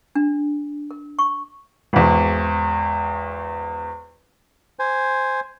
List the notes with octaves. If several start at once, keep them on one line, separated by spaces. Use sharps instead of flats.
D4
A#4
C#6
G#1 E2
C5 G#5